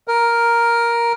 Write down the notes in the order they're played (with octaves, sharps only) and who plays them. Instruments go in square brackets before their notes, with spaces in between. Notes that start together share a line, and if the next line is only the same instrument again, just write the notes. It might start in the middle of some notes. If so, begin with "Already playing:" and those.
[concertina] A#4